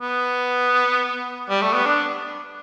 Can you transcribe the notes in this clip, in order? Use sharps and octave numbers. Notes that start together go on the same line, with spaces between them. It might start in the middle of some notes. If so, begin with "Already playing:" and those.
B3
G3
A3
B3
D4